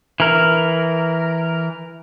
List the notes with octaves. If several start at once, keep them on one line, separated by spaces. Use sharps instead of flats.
E3 A#4